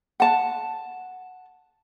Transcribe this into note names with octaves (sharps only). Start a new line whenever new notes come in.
F#5 A5